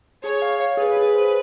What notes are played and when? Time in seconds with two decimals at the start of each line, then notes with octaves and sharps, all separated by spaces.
0.23 G#4 C#5
0.42 F5
0.60 F5
0.77 G#4 B4
0.97 G#4
1.15 C5